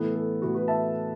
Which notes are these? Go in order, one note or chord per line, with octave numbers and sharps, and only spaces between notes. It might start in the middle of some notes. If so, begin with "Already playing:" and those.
Already playing: A2 E3 B3 E4 A4
A4
A2 E3 B3 E4 F#4
F#4 B4
E5 A5